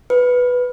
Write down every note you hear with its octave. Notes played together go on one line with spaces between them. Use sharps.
B4